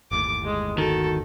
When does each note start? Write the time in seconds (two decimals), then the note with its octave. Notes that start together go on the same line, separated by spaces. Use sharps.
0.11 G1 D#2 A2 D6
0.44 G#3
0.78 D#3 F#4 A4